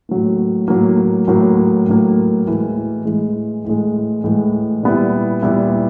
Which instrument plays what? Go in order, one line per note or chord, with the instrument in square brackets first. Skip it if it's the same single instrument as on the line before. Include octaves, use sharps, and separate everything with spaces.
[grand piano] A2 F#3 A#3
A2 F#3 A#3
A2 F#3 A#3
A2 F#3 A#3
A2 E3 G#3
A2 E3 G#3
A2 E3 G#3
A2 E3 G#3
A#2 G3 B3 E4
A#2 G3 B3 E4